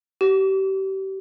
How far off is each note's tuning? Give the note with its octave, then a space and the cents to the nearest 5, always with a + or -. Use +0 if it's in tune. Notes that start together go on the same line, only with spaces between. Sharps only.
G4 -30